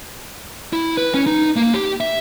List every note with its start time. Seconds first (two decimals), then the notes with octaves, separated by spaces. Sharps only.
0.73 E4
0.97 B4
1.14 C#4
1.26 D#4
1.56 A#3
1.74 G4
2.01 E5